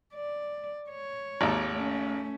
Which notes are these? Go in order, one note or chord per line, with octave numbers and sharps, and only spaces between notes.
D5
C#5
G#1 D#2
A3 C#4